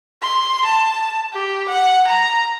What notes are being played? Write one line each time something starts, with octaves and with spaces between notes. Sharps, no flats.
C6
A5
G4
F#5
A#5